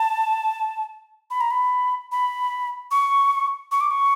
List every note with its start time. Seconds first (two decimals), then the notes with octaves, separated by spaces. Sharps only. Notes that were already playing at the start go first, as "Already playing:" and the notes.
Already playing: A5
1.31 B5
1.41 A#5
1.51 B5
2.12 B5
2.91 C#6
3.72 C#6
3.81 D6
3.91 C#6